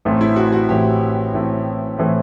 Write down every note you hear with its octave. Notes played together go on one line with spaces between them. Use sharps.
A1 A2 E3 A3 C4
E4
F#4
F#4
A1 A2 E3 A3 C4 G4
A1 A2 E3 A3 C4
A2 E3 A3 C4